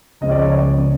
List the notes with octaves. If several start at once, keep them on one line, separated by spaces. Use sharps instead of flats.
C#2 C#3 F3 G#3 D#5
D5
C#5
D5
C#3 F3 G#3